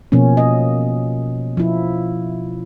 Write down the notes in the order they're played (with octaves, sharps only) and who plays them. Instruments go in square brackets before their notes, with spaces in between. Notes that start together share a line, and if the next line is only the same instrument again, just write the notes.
[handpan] B2 F3 A#3 C#4
D#5
F3 E4